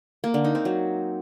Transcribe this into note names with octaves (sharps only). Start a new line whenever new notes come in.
A#3
D3
D#4
C4
F#3